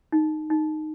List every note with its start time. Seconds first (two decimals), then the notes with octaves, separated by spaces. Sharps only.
0.12 D#4
0.50 D#4